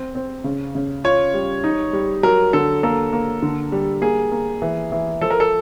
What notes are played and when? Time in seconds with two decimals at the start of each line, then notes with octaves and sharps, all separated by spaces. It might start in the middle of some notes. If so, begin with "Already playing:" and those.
Already playing: C4
0.15 C4
0.44 C#3
0.75 C#3
1.04 F4 C#5
1.34 G3
1.64 D#4
1.93 G3
2.23 F#3 A#4
2.53 D3 A4
2.83 A#3 A4
3.13 A#3
3.42 D3
3.72 G3
4.01 A#3 G#4
4.32 A#3
4.62 E3
4.92 E3
5.21 F3 A4
5.30 A#4
5.40 A4